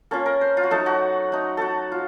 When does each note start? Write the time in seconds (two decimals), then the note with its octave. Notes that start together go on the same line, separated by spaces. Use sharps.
0.11 A#3 C#4 F4 A4
0.26 A#4
0.41 C5
0.57 F4
0.63 F#4
0.71 F#3 A3 D#4 A4
0.86 F#4
1.32 A3 D#4
1.57 F#4 A4
1.92 F4